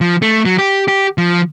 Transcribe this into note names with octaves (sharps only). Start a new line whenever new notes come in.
F3
A3
F#3
G4
G4
F3